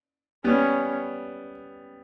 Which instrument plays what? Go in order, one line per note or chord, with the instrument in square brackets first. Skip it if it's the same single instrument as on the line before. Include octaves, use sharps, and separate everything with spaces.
[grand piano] G3 B3 [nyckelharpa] C#4